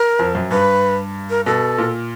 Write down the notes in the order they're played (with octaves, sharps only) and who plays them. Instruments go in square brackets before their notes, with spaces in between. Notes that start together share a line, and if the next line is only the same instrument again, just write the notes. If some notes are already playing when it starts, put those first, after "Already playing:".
Already playing: [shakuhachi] A#4
[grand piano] F2
F#2
[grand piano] G2 [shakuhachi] B4
[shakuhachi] A#4
[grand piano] B2 [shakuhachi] A4
[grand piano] A#2